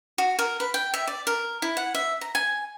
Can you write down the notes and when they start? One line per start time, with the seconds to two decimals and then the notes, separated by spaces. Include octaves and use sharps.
0.18 F#4
0.39 A#4
0.60 B4
0.74 G5
0.94 E5
1.07 D5
1.27 A#4
1.62 E4
1.77 F#5
1.95 E5
2.21 A#5
2.35 G#5